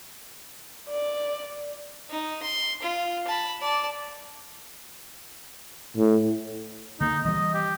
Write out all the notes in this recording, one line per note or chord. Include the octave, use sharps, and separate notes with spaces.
D5
D#4
C6
F4
A5 B5
D5 A5
A2
D3 A#3 D#4
E3 F3 G3 D#5
G4